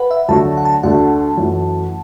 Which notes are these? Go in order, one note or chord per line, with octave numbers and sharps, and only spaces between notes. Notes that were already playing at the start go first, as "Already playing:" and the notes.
Already playing: B4 F#5 B5
E5
D2 D3 F#3 A3 F#4 A5
F#5
A5
D2 D3 A3 F#4 A4 F#5
F#2 E3 A3